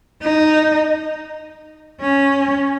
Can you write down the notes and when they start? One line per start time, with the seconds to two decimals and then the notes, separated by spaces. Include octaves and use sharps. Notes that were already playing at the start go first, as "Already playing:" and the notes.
0.22 D#4
2.01 C#4